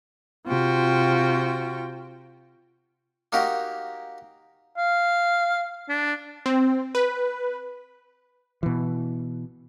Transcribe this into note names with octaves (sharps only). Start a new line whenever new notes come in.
C3 F4 F#4 G5
A#3 D#4 F#4 G4 A#4
F5
D4
C4
B4
B2 E3